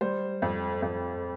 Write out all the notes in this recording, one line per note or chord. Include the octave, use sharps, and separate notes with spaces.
G3 C5
F2
F2